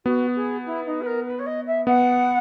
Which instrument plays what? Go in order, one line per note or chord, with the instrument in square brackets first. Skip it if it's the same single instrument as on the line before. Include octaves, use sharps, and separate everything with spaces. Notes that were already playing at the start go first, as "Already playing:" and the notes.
[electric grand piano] B3 [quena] F#4
[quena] G#4
E4
D#4
B4
A#4
B4
C#5
D#5
E5
[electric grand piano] B3 [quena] F#5